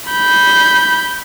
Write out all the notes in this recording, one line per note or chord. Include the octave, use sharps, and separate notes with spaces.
B5 G6